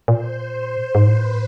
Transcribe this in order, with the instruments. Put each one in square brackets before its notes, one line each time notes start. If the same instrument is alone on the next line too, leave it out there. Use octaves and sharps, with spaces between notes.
[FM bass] A#2 [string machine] C5
[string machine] C5
[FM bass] G#2
[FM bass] A2 [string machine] B4